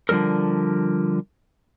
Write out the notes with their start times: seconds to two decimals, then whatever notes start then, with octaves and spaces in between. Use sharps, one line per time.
0.09 D3 F3 G3 A4 A#4